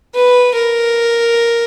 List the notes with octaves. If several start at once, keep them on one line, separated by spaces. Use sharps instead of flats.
B4
A#4